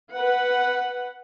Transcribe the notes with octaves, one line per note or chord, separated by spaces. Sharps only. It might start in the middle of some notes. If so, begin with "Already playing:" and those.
B4 F#5